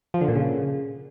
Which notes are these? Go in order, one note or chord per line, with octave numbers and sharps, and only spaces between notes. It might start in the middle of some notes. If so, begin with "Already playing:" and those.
F3
D3
A#2
C#3